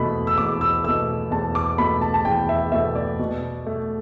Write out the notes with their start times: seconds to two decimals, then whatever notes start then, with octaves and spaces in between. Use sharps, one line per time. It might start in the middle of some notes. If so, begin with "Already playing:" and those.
Already playing: E2 B2 A3 B5
0.27 E6
0.38 E2 D6
0.61 E6
0.84 B2 A3 E6
1.31 E2 A5
1.55 D6
1.78 B2 A3 B5
2.01 A5
2.14 A5
2.25 E2 G5
2.49 E5
2.72 B2 A3 E5
2.95 D5
3.19 B2
3.66 A3